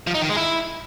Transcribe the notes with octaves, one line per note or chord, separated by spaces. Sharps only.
F3
D#4
D#3
G#3
E4